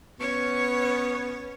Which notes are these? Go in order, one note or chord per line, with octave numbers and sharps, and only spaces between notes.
B3 C#4 C#5 C#6